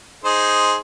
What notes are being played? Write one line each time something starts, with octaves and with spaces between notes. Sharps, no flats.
D#4 G#4 C5